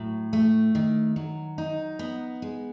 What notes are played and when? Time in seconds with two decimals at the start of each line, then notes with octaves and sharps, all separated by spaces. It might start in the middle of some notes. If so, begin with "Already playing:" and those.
Already playing: A2 F#3
0.33 A3
0.75 D#3
1.16 F#3
1.58 D#4
1.99 B3
2.42 G#3